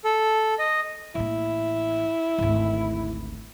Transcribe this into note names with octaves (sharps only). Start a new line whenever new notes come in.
A4
D#5
A1 A#3 E4
G#1 D2